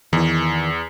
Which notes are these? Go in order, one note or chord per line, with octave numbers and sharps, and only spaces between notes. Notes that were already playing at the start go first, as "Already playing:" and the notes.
E2 D#3 E3